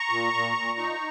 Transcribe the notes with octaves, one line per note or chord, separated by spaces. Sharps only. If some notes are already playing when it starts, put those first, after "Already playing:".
Already playing: A#5 C#6
A#2
A#2
A#2
D#4